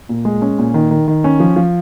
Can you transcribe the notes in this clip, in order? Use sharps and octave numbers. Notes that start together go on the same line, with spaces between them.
A#2
G#3
C#4
A#2
D#3
D#3
D#3
C#4
F3
F3